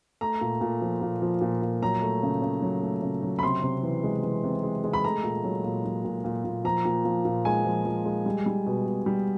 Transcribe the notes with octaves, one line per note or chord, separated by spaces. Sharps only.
A3 A#5
A#2
A#2
F3
A#2
F3
A#2
A#2
F#3 A#5
A3
C#3
C#3
F#3
A3
C#3
F#3
B5
C3 C6
C3
E3
G#3
E3
C3
G#3
G#3
B5
A3 A#5
A#2
F#3
A#2
F#3
A#2
A#2
A#2
F3 A#5
A#2
F3
A#2
G#3 G#5
F3
F3
G#3
G3
G3
B2
B2
G3